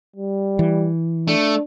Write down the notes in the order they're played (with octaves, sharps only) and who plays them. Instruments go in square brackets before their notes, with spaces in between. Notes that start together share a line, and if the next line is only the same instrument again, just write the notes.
[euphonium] G3
[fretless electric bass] E3
[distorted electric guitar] A3 [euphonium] D4